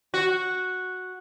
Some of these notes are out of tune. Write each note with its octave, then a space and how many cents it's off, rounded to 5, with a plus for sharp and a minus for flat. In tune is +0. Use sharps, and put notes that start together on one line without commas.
F#4 -5